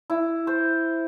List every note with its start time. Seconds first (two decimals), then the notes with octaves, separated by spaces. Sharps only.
0.10 E4
0.47 C5